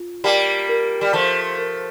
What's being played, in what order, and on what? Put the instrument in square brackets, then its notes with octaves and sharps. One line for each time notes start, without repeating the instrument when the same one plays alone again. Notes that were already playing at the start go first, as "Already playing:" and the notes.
Already playing: [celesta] F4
[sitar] G3 A#3 [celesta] A5
[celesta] A#4
[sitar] G3
[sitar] F3 A3 [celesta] A5
[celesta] A#4